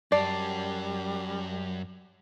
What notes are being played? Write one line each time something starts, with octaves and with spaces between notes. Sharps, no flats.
F#2 G3 D5 A5 A6 C7